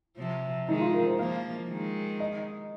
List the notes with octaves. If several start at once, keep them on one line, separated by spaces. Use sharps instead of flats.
C3 F3
D#3 G#3 D#4
F4
A#4
C5
F3 A#3 F5
D#3 G#3
D#5